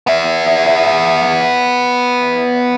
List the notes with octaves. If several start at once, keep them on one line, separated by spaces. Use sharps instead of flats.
B3 E5